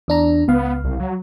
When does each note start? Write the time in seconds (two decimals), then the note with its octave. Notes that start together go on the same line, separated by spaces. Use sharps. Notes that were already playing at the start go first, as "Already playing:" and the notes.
0.08 E2 D4 A#5
0.48 C#2 B3 F5
0.84 C2
1.00 F#3